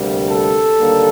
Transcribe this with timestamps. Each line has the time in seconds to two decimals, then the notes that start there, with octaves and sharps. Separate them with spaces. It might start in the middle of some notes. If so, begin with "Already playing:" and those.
Already playing: D2 C3 G3 A#3
0.30 A4
0.79 D#2 D3 G3 A#3